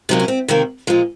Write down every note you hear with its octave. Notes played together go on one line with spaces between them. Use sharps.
C3 F#3 A#3 D#4
C#4
C4
C3 D#3 A#3
A#2 F3 G#3